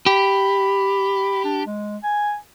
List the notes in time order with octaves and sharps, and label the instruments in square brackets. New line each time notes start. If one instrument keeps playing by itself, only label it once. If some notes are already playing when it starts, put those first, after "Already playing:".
[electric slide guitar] G4 [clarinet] B5
[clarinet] D4
G#3
G#5